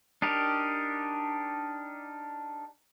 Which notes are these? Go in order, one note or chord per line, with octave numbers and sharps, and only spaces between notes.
D4 D#4 G4 A#4